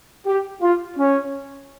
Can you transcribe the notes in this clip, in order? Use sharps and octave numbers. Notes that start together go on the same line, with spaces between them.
G4
F4
C#4